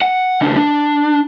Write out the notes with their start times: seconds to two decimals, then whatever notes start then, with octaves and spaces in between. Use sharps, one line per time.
0.02 F#5
0.41 C#2 D4
0.57 D4